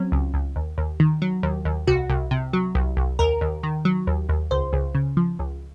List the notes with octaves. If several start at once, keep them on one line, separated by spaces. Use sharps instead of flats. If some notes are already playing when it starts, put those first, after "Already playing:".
Already playing: F#3 C4 C#4
C#2
C#2
D#2
D#2
D#3
F#3
D#2
D#2
C2 F#4
C2
C3
F#3
C2
C2
D#2 A#4
D#2
D#3
F#3
D#2
D#2
C#2 C5
C#2
C#3
F3
C#2